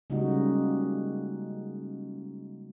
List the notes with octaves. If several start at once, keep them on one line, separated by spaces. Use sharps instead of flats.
C#3 G3 G#3 A#3 D#4 F#4